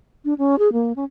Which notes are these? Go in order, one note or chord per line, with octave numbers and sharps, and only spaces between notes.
D4
C#4
G#4
A#3
C#4